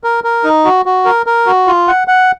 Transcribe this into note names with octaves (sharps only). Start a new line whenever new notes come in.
A#4
A#4
D#4
F#4
F#4
A#4
A#4
F#4
F4
F#5
F#5